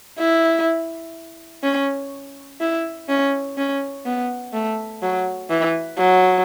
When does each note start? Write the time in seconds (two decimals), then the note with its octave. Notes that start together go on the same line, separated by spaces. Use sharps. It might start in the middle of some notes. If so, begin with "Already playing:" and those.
0.19 E4
1.63 C#4
2.60 E4
3.09 C#4
3.58 C#4
4.06 B3
4.53 A3
5.02 F#3
5.50 E3
5.98 F#3